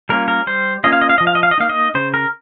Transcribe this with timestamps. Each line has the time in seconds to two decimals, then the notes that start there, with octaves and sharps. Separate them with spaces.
0.09 G3 A#3 C#4 F4 A#4
0.28 A#4
0.47 G3 C5
0.84 A#3 C#4 F4 D#5
0.93 F5
1.01 D#5
1.09 F5
1.18 F3 D#5
1.27 F5
1.35 D#5
1.43 F5
1.51 D#5
1.58 A#3 D#4 F5
1.70 D#5
1.95 C#3 C5
2.14 A#4